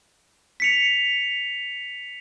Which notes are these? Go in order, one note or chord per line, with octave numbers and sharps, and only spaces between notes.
B6 C#7 F7